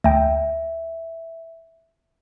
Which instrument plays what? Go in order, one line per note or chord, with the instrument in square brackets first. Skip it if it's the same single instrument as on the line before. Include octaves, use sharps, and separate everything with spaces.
[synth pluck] D2 G5 [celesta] E5